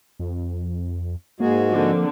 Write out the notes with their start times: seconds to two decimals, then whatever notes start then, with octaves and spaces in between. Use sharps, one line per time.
0.20 F2
1.40 G#2 G#3 A#3 F#4 G#4
1.72 D3 F3 A#3 C4